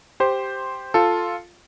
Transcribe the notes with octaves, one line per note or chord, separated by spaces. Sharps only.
G4 C5
F4 A4